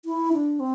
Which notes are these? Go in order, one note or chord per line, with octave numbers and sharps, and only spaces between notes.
E4
D4
C4